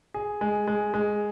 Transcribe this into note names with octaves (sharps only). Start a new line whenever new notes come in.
G#4
G#3
G#3
G#3